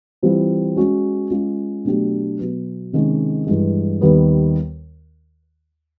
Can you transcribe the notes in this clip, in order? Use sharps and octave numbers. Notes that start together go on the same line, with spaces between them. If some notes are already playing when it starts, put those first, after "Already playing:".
E3 G3 C4 F4
G#3 C#4 F#4
G#3 C#4 F4
B2 F#3 A3 D4 G4
B2 F#3 B3
C3 D#3 G#3 C#4
G2 E3 G#3
D#2 D#3 G3 B3